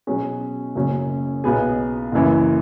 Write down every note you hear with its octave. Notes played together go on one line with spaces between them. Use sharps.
B2 F#3 C#4 G#4
F#1 F#2 C#3 F#3 C#4
B1 B2 B3 G#4
F#1 F#2 E3